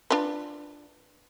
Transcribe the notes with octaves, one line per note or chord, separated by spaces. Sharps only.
D4 F4 B4